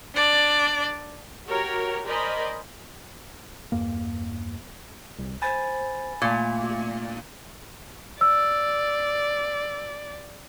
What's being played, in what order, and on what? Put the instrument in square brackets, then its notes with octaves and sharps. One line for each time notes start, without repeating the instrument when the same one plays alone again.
[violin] D4 D5
[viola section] F#4 G4 A#4 C#5
A#4 C5 D5 D#5 G#5 B5
[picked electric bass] E2 G2 A#3
[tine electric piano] C2
[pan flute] C5 [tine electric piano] G#5 B5 A6
[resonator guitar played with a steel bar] A#2 [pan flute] A3
[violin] D5 [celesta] E6